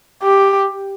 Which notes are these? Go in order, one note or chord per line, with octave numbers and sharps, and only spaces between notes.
G4